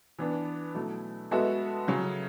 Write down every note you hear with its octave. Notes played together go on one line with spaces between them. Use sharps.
E3 B3 D4
B2 F#3 A3 E4
G#3 B3 F#4 A4 E5
C#3 F#3 C#4